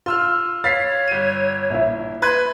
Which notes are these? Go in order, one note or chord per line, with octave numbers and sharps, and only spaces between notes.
F4 C6 E6 F6
C#5 F5 A6 B6 C7
G1 D#7
A#1 E4
B4 C6 F#6 G#6